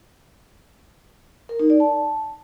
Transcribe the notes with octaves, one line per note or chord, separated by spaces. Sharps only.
A#4
D#4
D5
A5